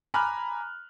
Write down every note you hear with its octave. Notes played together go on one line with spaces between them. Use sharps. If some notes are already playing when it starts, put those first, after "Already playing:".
G#5 A#5 B5 D6 F6 F#6